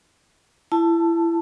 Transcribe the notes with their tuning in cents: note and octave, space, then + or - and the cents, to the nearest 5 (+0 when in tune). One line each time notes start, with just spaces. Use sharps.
E4 +25 A5 +0